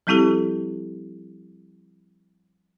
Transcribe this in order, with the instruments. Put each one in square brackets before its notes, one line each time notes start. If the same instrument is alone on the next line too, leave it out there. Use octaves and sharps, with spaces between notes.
[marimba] F3 G3 C4 E4 G4 A4